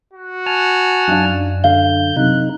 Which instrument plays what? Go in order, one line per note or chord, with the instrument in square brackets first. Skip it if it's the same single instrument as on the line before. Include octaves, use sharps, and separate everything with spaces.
[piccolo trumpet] F#4
[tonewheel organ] G#5 A5 F6
[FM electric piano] F#2 D4 [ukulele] D#4 F5
[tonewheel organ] D3 G6 [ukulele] F5
[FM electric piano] C3 F#3 [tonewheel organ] D#4 [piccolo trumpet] F#6